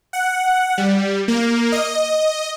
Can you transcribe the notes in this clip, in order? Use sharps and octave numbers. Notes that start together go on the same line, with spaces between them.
F#5
G3
A#3
D#5